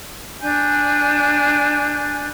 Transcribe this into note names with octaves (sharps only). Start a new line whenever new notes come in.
D4 G#5 G6